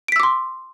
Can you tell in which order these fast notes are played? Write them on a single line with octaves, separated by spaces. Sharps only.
D7 B6 E6 D6 C6